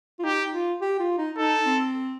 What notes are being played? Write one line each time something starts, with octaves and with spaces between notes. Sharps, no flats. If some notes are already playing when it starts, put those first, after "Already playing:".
F4
D#4 G4
F4
G4
F4
D#4
D#4 A4
C4